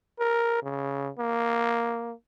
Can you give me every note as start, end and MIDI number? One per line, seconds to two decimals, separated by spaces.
0.19 0.59 70
0.63 1.10 49
1.19 2.13 58